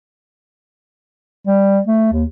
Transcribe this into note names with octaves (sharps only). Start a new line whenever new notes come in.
G3
A3
D#2